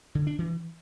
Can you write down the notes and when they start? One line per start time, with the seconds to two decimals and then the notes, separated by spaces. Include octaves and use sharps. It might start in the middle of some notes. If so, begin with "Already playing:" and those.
0.15 D3
0.27 D4
0.38 E3